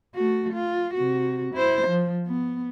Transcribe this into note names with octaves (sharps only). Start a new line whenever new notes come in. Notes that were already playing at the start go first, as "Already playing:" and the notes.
A3 F#4
F4
C3 F#4
E4 C5
F3
B3